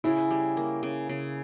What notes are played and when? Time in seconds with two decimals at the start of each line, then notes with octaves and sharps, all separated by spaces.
0.04 C#3 E4
0.31 G3
0.57 A#3
0.83 C#3
1.09 C#3